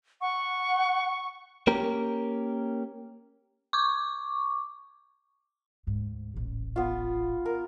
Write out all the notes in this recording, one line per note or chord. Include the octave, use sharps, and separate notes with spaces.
F#5 C#6
A#3 C#4 G4 A#4
C#6 D6
D2 G#2
D#1 A1
B3 F4
A#4